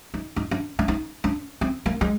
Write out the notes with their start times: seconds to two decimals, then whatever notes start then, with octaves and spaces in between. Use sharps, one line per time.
0.14 D#4
0.36 D#4
0.51 D4
0.79 D4
0.88 D#4
1.24 D4
1.61 C4
1.86 A#3
2.01 G#3